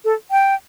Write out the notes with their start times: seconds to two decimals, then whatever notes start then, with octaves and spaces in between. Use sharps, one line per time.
0.05 A4
0.31 G5